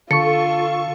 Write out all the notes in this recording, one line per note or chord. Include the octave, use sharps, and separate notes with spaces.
D3 F4 A4 C#6 C#7